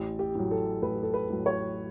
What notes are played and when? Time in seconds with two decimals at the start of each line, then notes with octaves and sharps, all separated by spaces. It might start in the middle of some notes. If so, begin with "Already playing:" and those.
Already playing: A1
0.19 G4
0.35 A2 F#3
0.51 A4
0.82 A1 B4
1.03 A4
1.14 B4
1.30 A2 F#3
1.46 C#5